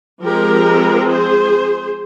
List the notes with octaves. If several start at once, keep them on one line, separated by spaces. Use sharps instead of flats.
F3 G#3 C4 G4 A#4
G#4 C5